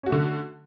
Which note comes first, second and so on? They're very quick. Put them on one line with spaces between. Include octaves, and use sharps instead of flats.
C#4 F#4 A3 D3